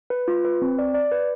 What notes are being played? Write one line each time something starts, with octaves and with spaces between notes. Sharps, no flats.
B4
F4
B4
C4
D5
D5
B4